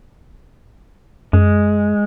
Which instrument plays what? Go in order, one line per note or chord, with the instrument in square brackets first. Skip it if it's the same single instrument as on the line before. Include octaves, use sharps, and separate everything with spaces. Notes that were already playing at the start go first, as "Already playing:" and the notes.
[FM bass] F#2 [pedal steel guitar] G#3